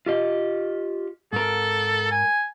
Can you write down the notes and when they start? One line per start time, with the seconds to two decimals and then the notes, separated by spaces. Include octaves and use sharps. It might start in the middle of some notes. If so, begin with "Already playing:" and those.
0.06 F4 G4 D#5
1.33 G#2 A4 A#4
2.12 G#5